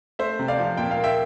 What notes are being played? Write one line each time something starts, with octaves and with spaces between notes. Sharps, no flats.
A3 C5 E5
C3
D5 F5
F3
A#2 G5
F5
A#3
E5 G5